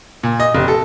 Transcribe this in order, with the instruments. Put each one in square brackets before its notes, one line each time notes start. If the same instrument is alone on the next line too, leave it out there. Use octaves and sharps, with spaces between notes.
[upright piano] A#2
D#5
F1
A4